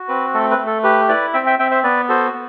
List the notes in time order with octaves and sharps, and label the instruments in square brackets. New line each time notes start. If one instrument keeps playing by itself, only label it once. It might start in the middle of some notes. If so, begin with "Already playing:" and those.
Already playing: [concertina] F#4
C4 B4
A3 A4
B4
A3
A4
G4 B4
E4 B4 D5
C4 E5 G5
E5 G5
C4 E5 G5
C5 E5
B3 B4 D5
F#4 A4 C5
B3